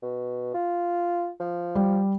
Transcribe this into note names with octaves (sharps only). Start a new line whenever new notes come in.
B2
F4
F3
G3